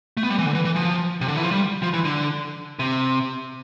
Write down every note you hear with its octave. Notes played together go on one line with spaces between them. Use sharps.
A3
B3
G3
E3
D3
E3
E3
F3
C3
D3
E3
F3
G3
F3
E3
D3
C3